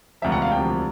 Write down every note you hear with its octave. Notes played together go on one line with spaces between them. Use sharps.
E1 D2 C3 F3 E5
F#5
F5
E1 D2 C3 F3 G5